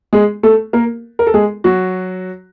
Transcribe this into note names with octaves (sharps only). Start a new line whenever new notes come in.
G#3 G#4
A3 A4
A#3 A#4
A#4
A4
G#3 G#4
F#3 F#4